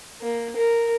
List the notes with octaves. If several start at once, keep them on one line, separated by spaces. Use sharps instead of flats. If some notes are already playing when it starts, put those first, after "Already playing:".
A#3
A#4